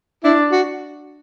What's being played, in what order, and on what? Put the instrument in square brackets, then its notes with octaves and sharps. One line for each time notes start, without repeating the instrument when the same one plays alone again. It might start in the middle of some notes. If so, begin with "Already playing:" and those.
[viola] D4 [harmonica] E4
[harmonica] F#4